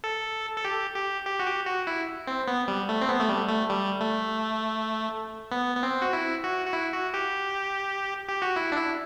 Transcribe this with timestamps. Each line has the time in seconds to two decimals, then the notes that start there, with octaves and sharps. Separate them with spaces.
0.04 A4
0.57 A4
0.65 G4
0.96 G4
1.26 G4
1.40 F#4
1.46 G4
1.67 F#4
1.87 E4
2.27 C4
2.48 B3
2.68 G3
2.89 A3
3.01 C4
3.09 B3
3.20 A3
3.29 G3
3.49 A3
3.69 G3
4.00 A3
5.52 B3
5.76 B3
5.83 C4
6.02 F#4
6.13 E4
6.44 F#4
6.66 F#4
6.73 E4
6.93 F#4
7.14 G4
8.29 G4
8.42 F#4
8.56 E4
8.72 D4
8.77 E4